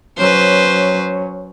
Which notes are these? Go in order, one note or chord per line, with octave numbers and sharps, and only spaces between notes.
F#3 C#4 B4 C5